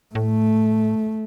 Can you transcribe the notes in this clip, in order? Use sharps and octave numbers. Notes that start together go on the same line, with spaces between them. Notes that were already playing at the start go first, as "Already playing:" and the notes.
A2 A3